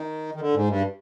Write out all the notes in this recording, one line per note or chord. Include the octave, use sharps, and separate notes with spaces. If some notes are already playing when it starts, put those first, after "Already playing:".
Already playing: D#3
D#3
D3
G#2
G2